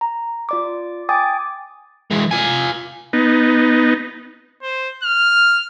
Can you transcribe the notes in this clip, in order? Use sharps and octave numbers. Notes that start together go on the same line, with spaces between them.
A#5
F4 D5 D6
G5 G#5 D6 D#6 A6
E3 G#3
F4 G#5
B3 D#4
C5
F6